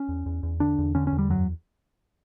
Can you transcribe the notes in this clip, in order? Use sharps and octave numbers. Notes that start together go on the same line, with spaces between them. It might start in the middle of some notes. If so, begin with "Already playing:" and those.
Already playing: C#4
E2
E2
E2
D3 D4
E2
D3 C#4
C#4
E2
G3
F#2 F#3